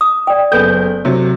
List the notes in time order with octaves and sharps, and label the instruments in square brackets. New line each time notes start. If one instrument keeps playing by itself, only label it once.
[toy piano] D#6
D5 G5
[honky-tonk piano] F#1 B3 G6 [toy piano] A4 G#5
[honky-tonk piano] C3 F#3